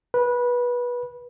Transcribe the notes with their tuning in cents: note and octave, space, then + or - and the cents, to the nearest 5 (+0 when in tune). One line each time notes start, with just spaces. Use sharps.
B4 -20